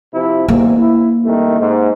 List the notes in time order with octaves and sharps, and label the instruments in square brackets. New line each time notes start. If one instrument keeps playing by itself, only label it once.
[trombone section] C3 F3 E4
[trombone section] E2 G#2 C3 [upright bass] A#3
[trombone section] E4
C2 D#3 A3
G#2